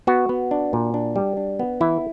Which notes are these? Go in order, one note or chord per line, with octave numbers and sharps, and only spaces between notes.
B3 F#4
B3
D4
A#2
D4
G3
D4
B3
E3 E4